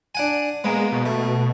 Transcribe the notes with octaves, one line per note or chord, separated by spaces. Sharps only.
D4 F#5 G#5
G#3 A#3 B3
B2
A3